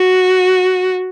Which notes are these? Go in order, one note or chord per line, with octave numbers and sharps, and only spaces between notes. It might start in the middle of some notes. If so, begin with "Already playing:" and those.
Already playing: F#4